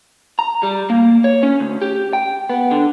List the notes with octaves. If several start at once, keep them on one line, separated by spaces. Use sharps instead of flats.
A#5
G3
A#3
C#5
C#4
D2
G4
G5
B3
D3